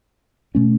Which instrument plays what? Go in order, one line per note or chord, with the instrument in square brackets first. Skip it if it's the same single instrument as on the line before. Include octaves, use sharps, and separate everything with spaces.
[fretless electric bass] B2 A3 C#4